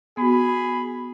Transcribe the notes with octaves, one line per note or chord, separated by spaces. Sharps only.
B3 F#4 G#4 B5